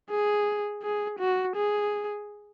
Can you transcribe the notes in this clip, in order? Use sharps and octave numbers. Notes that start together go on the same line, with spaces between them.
G#4
G#4
F#4
G#4